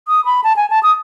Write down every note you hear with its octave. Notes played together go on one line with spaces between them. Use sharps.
D#6
B5
A5
G#5
A5
D#6